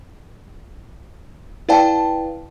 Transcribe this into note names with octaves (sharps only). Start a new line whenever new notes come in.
E4 B4 D5 F5 G5 A5